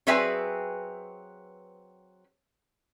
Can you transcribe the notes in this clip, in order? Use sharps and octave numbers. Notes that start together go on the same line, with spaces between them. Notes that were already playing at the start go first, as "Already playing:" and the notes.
F#3 C4 G#4 B4 E5 G#5